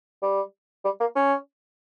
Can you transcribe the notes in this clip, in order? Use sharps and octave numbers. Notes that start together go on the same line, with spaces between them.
G3
G3
A#3
C#4